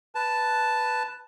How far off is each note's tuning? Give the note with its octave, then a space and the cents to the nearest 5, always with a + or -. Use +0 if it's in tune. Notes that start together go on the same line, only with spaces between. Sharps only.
B4 +0 A5 +0